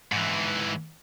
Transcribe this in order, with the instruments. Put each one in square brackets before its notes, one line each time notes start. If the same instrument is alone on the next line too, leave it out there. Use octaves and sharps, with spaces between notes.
[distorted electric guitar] G#2 E3